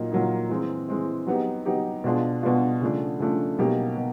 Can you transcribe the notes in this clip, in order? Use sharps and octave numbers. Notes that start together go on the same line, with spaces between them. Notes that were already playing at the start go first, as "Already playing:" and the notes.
Already playing: A#2 F#3 A#3 D#4
A#2 F#3 A#3 D#4
E3 G#3 C4
E3 G#3 C4
F#3 B3 D#4 G4
F#3 B3 D#4 G4
B2 G#3 B3 D4 F4
B2 G#3 B3 D4 F4
C#3 F3 A3 D4
C#3 F3 A3 D4
B2 F#3 A#3 D#4 G4
B2